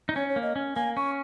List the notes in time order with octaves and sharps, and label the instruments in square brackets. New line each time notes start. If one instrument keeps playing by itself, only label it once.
[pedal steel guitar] D#4
[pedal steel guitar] C#4 [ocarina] C#5
[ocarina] C#5
[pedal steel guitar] A#3
[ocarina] D#5
[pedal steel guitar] C#4
[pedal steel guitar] A#3 [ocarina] G#5
[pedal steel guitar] C#4 [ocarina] C#6